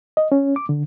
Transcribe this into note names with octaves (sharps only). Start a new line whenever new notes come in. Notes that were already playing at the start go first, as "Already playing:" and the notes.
D#5
C#4
D6
D3